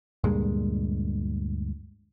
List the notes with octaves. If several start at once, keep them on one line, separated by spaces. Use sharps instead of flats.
D2 G2 A#2 G#3